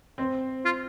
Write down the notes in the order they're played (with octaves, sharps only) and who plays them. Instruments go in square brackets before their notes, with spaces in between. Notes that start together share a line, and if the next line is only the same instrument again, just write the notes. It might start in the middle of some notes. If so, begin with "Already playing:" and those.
[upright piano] C4 C5
[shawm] F4